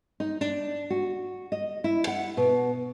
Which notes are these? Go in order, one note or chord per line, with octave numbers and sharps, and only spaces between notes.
D#4
D4
F#4
D#5
E4
F#5
B2